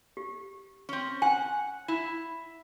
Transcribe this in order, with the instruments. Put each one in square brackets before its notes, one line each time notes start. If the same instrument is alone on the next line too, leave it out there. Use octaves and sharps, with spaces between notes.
[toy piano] G4
[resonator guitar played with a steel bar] C4 C#4
[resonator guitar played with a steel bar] F#5 [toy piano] G#5
[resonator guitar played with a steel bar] E4